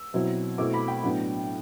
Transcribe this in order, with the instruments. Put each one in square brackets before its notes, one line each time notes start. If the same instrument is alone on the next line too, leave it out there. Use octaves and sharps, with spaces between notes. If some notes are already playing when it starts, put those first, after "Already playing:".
Already playing: [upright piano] E6
B2 F#3 C4 E4
B2 A3 C4 E4 D6
B5
G5
A2 F#3 B3 D4